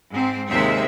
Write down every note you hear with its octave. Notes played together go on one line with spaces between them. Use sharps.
G#2 C4
D#2 C3 G#3 C4 E5